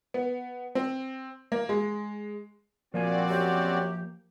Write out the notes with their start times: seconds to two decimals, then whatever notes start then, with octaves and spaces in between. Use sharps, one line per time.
0.14 B3
0.75 C4
1.52 A#3
1.69 G#3
2.94 A#2 F3 A#3 C4 F#4 D5 G#5
3.29 F#2 G4